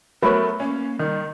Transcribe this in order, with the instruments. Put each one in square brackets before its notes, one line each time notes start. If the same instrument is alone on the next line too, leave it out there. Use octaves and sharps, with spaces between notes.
[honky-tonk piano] F#3 A3 B3 [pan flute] A#4 [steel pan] B4 C#5
[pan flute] A#3 [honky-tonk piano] C#4
[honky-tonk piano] D#3 [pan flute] G3